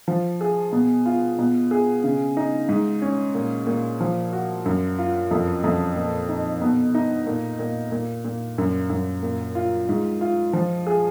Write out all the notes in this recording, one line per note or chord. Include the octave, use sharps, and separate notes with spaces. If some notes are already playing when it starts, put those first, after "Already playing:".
F3
G#4
B2
F4
B2
G#4
C#3
D#4
G#2
C#4
A#2
A#2
F3
F#4
F#2
F4
F2
F2
A#2
D#4
B2
D#4
A#2
A#2
A#2
A#2
F#2
F#2
A#2
F4
G#2
F4
F3
G#4